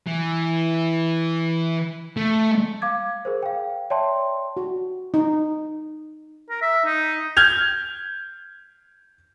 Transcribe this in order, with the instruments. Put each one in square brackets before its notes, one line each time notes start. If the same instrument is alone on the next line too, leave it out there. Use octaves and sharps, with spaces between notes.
[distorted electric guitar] E3
A3
[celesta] F5 D6 G#6
G#4 A#4 C5
F5 G5
C#5 D5 E5 G5 A5 C6
[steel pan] F#4
D#4
[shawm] A#4
E5
D#4
[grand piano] F6 G6 G#6 F7